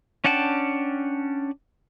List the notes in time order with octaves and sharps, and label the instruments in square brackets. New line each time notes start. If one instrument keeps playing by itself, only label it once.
[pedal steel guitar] C#4 D4 F#5 G5 A5